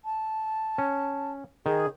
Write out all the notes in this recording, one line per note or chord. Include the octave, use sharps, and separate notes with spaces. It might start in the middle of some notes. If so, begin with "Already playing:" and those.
A5
C#4
D#3 G#4